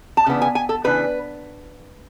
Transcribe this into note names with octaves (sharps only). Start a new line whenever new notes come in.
A5
C#3 E3 B3 D4
G#5
G#5
A4
C#3 E3 B3 D4 B4